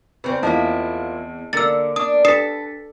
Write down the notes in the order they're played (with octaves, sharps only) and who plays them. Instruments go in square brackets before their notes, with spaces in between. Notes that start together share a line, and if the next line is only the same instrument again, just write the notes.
[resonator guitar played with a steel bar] C#3 C4 [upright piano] B4 C5 D5
[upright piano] E2 C4 [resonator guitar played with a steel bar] F3 A#3 E4 [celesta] D#5 A5
[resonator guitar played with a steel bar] D3 [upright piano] A#3 A#4 C#7 [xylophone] E6 A6
[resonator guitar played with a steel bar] D4 [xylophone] D#6
[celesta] D4 A6 B6 [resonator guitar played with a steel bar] A4 [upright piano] B4 [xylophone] D#6 C7 E7